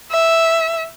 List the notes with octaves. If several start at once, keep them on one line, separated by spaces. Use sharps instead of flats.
E5